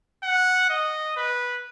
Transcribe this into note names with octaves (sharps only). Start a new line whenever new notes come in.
F#5
D#5
B4